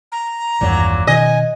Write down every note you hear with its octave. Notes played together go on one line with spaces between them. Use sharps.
A#5
G#1 E2 G2 A#2 F#3
B2 D#3 D#5 G#5